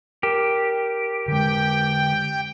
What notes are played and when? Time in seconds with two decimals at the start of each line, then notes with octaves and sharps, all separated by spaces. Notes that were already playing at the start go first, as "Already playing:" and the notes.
0.23 G4 A#4
1.28 D3 G#3 G5